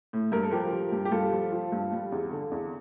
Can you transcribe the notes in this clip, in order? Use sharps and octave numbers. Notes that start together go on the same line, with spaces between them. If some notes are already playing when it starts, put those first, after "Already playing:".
A2
G2 A#4
A4
F3 G4 A#4
F3
G2
G4
G2 F4 A4
F3
F3
G2
G3
E2
D3
E2